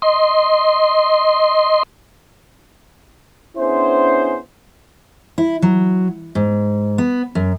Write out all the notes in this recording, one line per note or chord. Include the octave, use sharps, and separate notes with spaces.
D#5 C6
B3 C#4 D4 E4 G#4 C5
E4
F#3
G#2
B3
F#2